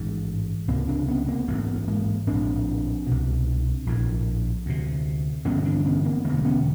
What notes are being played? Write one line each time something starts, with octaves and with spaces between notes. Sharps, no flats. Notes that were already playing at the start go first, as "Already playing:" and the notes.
Already playing: A1 G#2
C#2 C3 A#3 C4
C4 D4
B3 C#4
A#3 C4
A1 G#2 A3 B3
G#3 A#3
A#1 A2 C4 D4
C2 B2
A#1 A2
D2 C3
A1 G2 D3 B3 C#4
C4 D4
B3 C#4
A#3 C4
E1 D2 D3 A3 B3
B3 C#4